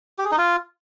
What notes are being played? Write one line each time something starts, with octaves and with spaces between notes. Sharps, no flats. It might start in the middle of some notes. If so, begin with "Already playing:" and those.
G4
G#4
D#4
F4